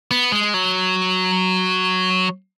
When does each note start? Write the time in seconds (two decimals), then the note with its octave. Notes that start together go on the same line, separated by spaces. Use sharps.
0.11 B3
0.32 G#3
0.54 F#3